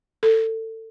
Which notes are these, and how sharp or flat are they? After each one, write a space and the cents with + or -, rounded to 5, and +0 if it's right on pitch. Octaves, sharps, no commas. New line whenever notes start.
A4 +25